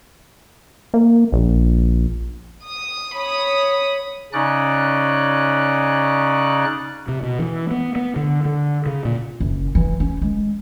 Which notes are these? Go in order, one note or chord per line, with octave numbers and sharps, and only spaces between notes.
A#3
A#1
D#6
C#5 B5 D#6
C#3 C#4 D#4 D5 F#6
C3
B2
E3
B3
B3
D3
D3
C#3
A#2
F#1
E3
C#4
G#3